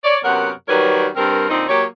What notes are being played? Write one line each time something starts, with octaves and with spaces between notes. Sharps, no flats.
C#5 D5
F#2 C3 B3 A#4 C#5 F#5
D#3 F#3 G3 A#4 B4 C#5
G2 C4 A#4
A#2 D3 C4 D#4
F#3 A#3 G4 C#5